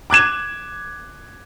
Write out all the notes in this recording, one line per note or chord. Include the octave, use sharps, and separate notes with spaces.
D6 F#6 G#6 E7